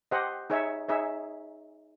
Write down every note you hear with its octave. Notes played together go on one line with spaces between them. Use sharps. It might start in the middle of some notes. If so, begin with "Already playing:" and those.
G4 C5 D#5 F#5
D#4 G#4 C#5 E5
D#4 G#4 C#5 E5